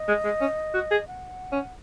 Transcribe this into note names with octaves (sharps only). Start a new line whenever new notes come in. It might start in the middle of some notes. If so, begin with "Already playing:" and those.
Already playing: D#5
G#3
G#3
C#4
F#4
G#4
F#5
C#4